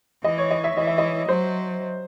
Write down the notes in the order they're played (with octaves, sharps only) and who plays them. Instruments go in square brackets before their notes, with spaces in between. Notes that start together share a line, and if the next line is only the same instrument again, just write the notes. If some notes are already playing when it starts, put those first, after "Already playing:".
[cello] E3 [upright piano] D#5
[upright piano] C#5
D#5
E5
[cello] E3 [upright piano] D#5
[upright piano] E5
D#5
[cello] F#3 [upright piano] C5